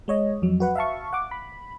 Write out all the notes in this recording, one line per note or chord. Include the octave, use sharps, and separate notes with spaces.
G#3 C#5 D#5
F2 F#3
F#4 B4 F#5
E5 F5 A5 C#6
F#5 D6
B5